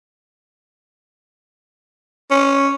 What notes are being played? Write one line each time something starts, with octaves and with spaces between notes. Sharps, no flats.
C#4